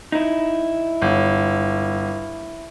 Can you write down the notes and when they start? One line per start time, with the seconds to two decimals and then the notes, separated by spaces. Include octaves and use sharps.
0.12 D#4 E4
1.02 G1